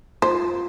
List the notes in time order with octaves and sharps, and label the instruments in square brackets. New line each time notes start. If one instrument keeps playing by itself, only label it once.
[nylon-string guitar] F4 [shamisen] C5